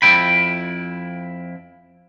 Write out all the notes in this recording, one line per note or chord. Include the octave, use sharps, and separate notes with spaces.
F2 E4 G5 B5